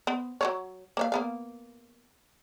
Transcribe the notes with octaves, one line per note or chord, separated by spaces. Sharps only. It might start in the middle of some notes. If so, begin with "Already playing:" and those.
B3
F#3 B3 C#5
A#3 C#5 F5
A#3 B3 F5